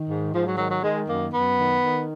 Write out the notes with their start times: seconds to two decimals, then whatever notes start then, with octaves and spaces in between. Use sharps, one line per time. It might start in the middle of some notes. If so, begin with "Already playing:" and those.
Already playing: D#3
0.08 G#2
0.33 G#2 F3
0.46 F#3
0.57 D#3 F#3
0.70 F#3
0.83 D#3 G#3
1.07 F#2 A#3
1.33 F#2 B3
1.58 D#3
1.82 D#3